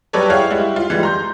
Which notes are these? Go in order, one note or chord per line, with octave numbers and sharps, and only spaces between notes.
F#3 G3 A4 B4 C#5 D5
E4 G4 G#4 C#5 F5 F#5
G3 G#3 E4
F4
E3 G3 G#3
A#5 C6 G6